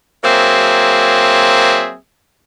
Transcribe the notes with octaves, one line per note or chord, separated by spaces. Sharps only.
F#3 A#3 C4 G#4 E5